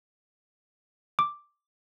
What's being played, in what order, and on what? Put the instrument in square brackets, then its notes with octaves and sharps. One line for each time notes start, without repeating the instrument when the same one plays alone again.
[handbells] D6